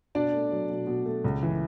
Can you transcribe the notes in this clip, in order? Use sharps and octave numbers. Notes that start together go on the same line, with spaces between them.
B2 D4 D5
A3
F#3
B2
B2
A3
C#2
E3